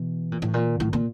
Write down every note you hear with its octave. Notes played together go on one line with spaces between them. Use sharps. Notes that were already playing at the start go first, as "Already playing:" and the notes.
Already playing: B2 E3
A#2
A2
A#2
D#3
A2
A#2